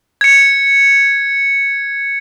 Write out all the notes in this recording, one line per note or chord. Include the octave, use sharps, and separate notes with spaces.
G#6 C#7